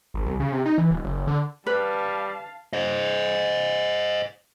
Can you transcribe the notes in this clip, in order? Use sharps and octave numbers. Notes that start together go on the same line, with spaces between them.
G#1
C2
C#3
C3
D#4
E3
D#1
F#1
D3
G3 B4 F5 A5
C5 D#5